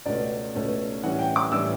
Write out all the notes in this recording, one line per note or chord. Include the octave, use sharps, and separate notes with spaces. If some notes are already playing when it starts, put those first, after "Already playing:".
C#2 B2 A3 C#4 D5
C#2 B2 A3 C#4
A2 E3 G3 C#4 F#5
G5
D6
A2 E3 G3 C#4 E6